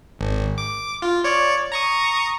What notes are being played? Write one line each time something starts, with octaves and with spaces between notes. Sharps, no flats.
G#1
D6
F4
C#5 D5
A#5 C#6 D#6